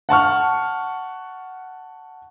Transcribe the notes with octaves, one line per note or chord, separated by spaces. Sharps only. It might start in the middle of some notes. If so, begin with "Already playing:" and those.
F#5 A5 C#6 F6